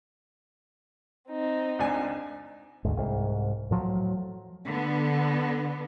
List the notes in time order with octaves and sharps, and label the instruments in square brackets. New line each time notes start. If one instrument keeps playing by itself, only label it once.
[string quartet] C4 D#4
[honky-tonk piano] C#2 D4 G#5
[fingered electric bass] D2 G#2
C2 G#2
A2 F3 F#3
[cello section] D3 B3